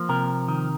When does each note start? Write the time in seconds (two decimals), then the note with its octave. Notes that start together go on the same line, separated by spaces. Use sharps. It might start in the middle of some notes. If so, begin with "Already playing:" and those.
Already playing: F3 A#3
0.09 C3 A#4
0.48 D#3